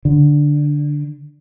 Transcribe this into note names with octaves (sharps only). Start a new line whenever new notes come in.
D3